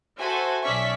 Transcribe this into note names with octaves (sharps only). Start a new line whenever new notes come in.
F#4 A4 C5 E5 F#5 G#5
B1 C#4 D5 E5 C#6 B6